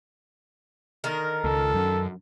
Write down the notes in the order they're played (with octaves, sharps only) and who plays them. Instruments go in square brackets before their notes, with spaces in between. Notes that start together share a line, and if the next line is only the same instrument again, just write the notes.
[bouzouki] D3 D#3 A#4
[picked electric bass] C#2 [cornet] A4
[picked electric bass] F#2